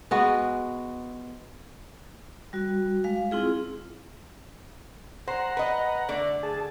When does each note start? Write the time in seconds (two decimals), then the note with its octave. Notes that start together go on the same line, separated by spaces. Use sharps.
0.11 G#3 B3 F#4
2.53 G3 F#4
3.04 G#3 F5
3.31 C4 E4 F4 G#4
5.27 C5 F#5 A#5
5.57 B4 D#5
6.09 D3 A3 D5
6.43 G#4 A5